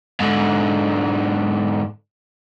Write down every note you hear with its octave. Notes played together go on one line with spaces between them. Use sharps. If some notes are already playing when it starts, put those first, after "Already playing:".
G#2 D3